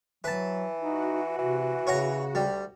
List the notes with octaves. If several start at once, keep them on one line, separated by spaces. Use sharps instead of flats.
E3 F#3 B4 A5
D#4 F#4
C3 E3
C#3 C#5 F#5 A#5
D2 G3